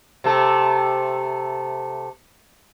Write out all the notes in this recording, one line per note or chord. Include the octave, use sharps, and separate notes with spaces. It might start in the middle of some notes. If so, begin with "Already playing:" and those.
C3 A3 A4